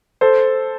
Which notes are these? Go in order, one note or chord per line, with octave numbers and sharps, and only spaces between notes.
A4 C5